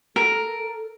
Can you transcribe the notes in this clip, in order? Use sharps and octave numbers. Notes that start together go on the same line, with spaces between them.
A4 A#4